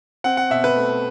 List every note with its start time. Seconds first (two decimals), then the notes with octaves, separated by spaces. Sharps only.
0.24 C4 F#5
0.37 F#5
0.50 B2 E5
0.64 B4
0.76 A3